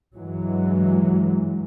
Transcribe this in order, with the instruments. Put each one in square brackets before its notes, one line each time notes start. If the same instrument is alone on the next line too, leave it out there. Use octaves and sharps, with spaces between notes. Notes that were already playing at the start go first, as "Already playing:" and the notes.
[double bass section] G2 E3 F#3 G#3